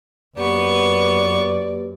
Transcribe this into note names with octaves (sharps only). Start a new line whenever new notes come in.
F#2 A#3 B3 G4 B4 D5 C#6